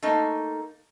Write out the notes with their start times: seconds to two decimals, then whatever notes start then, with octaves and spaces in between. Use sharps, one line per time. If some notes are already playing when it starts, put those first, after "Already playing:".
0.03 A3 A#3 D#4